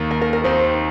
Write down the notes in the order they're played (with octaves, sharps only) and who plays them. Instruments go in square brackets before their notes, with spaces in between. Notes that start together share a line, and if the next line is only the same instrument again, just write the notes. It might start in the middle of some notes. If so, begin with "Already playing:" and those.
Already playing: [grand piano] D#2 D#3 A#3
[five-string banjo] A#4
A#4
A#4
[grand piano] D#2 D#3 C4 D#4 [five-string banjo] C5